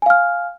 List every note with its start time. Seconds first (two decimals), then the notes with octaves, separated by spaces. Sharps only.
0.02 G#5
0.06 F5
0.10 F6